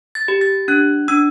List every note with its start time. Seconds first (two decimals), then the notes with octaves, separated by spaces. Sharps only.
0.15 A6
0.28 G4
0.41 A6
0.68 D4 F#6
1.08 D4 E6